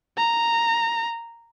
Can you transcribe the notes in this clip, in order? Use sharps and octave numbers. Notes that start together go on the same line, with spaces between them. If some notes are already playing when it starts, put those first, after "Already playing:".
A#5